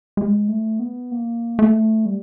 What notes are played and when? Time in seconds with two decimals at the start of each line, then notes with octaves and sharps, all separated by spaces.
0.17 G#3
0.48 A3
0.79 B3
1.11 A#3
1.59 A3
2.06 G3